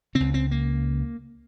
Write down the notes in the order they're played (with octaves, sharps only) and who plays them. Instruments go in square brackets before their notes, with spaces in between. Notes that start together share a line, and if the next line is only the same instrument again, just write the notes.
[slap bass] C#3 C4
C#2
C4
A#3